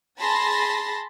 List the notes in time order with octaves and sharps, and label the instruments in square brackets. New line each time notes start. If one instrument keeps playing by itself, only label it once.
[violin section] G#4 A5 B5 C6 A6 A#6